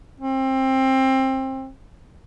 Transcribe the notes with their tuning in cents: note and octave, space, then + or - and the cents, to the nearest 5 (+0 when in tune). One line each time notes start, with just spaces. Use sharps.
C4 +20